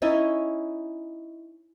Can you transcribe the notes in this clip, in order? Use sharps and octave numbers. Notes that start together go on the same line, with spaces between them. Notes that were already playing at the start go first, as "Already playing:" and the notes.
C#4 D#4 E4 D#5